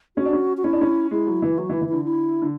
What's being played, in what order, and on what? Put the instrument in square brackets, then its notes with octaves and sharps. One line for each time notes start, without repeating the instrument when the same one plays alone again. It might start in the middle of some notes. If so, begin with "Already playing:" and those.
[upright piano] C#4 [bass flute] F#4
[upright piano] D4
C#4
[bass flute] F#4
[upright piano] C#4 [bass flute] E4
[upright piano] D4
C#4
[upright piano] G#3 [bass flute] E4
[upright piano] F#3
E3
[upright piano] F#3 [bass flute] F#4
[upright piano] E3
[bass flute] E4
[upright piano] E3
[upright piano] D3 [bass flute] E4
[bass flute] E4
[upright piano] D3